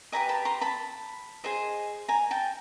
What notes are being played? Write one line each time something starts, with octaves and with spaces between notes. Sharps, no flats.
G4 B4 D#5 G#5 A#5
A5 B5
A#5 C6
A5 B5
G#4 C5 D#5
G#5 A#5
G5 A5